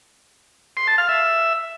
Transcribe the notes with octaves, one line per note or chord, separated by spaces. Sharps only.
C6
A5
F5
E5